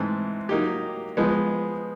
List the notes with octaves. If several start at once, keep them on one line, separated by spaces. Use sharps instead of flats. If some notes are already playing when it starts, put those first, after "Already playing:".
Already playing: G#2 E3 A3 C4
F#3 A#3 D#4 G4
F3 G#3 B3